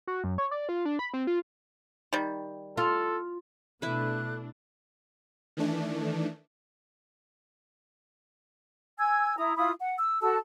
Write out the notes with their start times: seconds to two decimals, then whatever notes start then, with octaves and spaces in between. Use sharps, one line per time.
0.07 F#4
0.24 F#2
0.38 C#5
0.51 D5
0.69 F4
0.85 D4
0.99 B5
1.14 C4
1.27 F4
2.13 D#3 G3
2.77 F4 A4
3.82 B2 A3 D4 E4 B4 F#6
5.57 D#3 E3 A3 D4
8.98 G#5 E6 G#6
9.37 E4 A#5 D#6
9.56 E4 F4 B5 D#6
9.79 F#5
9.98 E6
10.21 F#4 A4 A5 E6